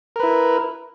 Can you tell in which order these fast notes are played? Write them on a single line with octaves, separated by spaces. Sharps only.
A#4 B4 E4